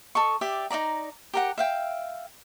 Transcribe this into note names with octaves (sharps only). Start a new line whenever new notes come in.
A4 D#5 C#6
G4 D5 E5
D#4 F#4 D5 A#5
G4 A#4 F#5
E5 F5 G5